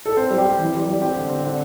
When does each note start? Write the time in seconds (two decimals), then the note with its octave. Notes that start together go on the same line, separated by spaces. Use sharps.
0.06 A4
0.17 C4 C5
0.30 G3
0.38 G4
0.46 C4
0.59 E3
0.74 G3
0.88 G3
1.01 C4 G4
1.16 D3
1.29 C4
1.44 D3